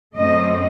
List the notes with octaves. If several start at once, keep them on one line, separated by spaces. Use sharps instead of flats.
F#2 D3 A3 C4 D#5